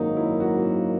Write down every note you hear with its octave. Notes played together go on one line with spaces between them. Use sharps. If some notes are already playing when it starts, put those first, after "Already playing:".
Already playing: G#1 F#2 D#3 F#3 A#3 D#4
E4
F#4